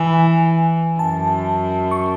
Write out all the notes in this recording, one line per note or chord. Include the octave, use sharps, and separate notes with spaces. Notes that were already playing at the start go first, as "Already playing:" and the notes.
Already playing: E3 G#5
F#2 A5
C#6